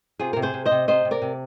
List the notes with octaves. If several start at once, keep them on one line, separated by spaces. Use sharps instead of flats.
C3 F4 G#4
C3 A#4
G#4 C5
C3
C5 D#5
C3
C3 C5 D#5
C3
A#4 D5
C3